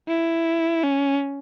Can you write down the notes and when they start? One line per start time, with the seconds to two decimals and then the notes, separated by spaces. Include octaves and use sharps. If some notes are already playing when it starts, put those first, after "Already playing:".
0.08 E4
0.84 C#4